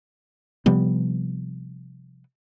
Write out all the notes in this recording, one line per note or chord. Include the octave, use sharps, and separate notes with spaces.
C3 F3 G3 B3